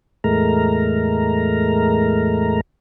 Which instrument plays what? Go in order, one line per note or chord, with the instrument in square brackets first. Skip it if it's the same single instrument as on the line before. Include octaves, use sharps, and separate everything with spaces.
[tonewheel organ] E2 A2 G#3 A3 A#4 A#5